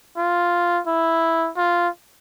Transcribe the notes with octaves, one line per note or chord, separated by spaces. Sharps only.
F4
E4
F4